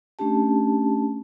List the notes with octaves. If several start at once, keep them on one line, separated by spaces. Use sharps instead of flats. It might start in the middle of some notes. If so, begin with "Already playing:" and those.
A3 C#4 D4 G4 A5